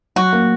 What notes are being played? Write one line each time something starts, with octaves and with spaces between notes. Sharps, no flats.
F#3 F#4
A#3